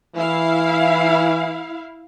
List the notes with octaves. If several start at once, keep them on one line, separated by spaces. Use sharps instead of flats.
E3 E4 F5